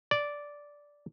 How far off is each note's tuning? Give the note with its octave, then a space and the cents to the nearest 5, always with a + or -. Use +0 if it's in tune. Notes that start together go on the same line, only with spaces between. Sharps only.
D5 -5